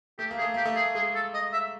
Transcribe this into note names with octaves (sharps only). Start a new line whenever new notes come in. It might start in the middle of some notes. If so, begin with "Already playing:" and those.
A3 G4
A#3
G#4
A3
A#3 G4
A3
G#4
G#3 G#4
A4
D#5
E5